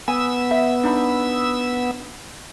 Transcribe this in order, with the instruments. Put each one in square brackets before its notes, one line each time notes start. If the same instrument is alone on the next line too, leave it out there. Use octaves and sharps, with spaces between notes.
[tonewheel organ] B3 E6 [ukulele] G#5
[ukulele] E5
D4 D#4 B5